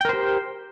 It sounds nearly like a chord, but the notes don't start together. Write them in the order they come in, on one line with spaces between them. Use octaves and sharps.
G5 A#4 C5 G4